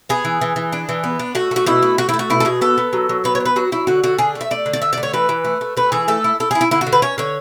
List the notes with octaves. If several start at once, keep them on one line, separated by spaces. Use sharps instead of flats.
B3 G#4
E3
E3
E3
D4
E3
B3
D4
A3 F#4
A3 F#4
B2 E4
A3
A3 F#4
A3 E4
F#4
B2 E4
A4
B2 G#4
B3 A4
B3
F#3
F#3
B3 B4
C#5
D4
B4
F#3 F#4
F#3 E4
D3 F#4
D3 F#4
D4 G#4
A3
E5
A3 D5
D3
D5
D3 E5
D5
A3
C#5
E3 B4
E3
A3
A3
A3 B4
E3 G#4
A3 A4
E4
E4 A4
E4 G#4
E4
D3 E4
F#4
D3
B4
C#4 C#5
D3 C#5